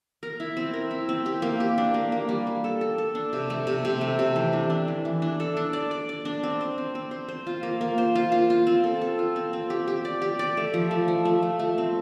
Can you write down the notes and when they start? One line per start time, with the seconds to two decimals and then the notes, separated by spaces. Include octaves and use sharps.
0.23 A#4
0.40 E4
0.57 C4
0.74 A#4
0.91 E4
1.09 C4
1.26 G4
1.42 A#3
1.60 G4
1.78 D4
1.94 A#3
2.12 A#3
2.29 G3
2.47 A#3
2.64 A4
2.81 A4
2.98 A4
3.15 D4
3.33 C3
3.50 A3
3.67 C3
3.85 C3
4.01 A3
4.19 C3
4.36 E3
4.53 D4
4.70 D4
4.88 E3
5.05 E3
5.22 D4
5.40 A4
5.57 D4
5.73 D5
5.91 D5
6.09 D5
6.25 D4
6.43 C4
6.61 C5
6.78 C4
6.95 C4
7.11 C5
7.28 C5
7.47 F4
7.63 A#3
7.81 A#3
7.98 C5
8.15 F4
8.32 F4
8.50 F4
8.67 C4
8.84 A4
9.01 A4
9.19 F4
9.36 C4
9.53 C4
9.70 G4
9.88 G4
10.05 D5
10.22 G4
10.39 D5
10.57 A3
10.74 F3
10.91 A3
11.08 F3
11.25 A3
11.43 A3
11.59 A3
11.78 C4